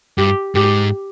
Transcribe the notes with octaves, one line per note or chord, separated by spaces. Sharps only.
G2 G4
G#2 G4